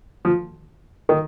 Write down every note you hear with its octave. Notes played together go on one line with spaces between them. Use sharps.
F3
D#3